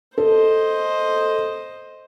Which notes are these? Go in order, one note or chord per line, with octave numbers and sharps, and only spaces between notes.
A4 C5 D#5